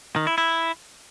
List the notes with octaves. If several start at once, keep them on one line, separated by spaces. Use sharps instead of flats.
D#3
E4
E4